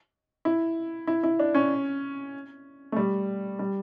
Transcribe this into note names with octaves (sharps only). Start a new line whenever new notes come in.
E4
E4
E4
D4
C#4
A3
G3
G3